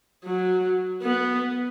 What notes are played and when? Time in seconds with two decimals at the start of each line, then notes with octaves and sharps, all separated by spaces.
0.24 F#3
1.02 B3